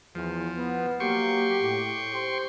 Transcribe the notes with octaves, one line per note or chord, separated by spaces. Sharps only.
E2 F3
B3
F#3 A#3 G4 G5 C6 C#6
A2
G4 C5